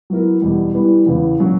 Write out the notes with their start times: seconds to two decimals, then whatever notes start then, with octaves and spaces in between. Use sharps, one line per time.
0.10 F#3 B3 E4 A#4
0.42 E2 B2 G3
0.74 E3 G3 B3
1.06 E2 C#3 E3 B3
1.39 A#2 F#3 C#4 F#4